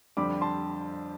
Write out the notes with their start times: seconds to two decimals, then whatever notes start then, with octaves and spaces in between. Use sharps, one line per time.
0.17 F2 D3 G3 D4 B5 D6
0.41 A5 C6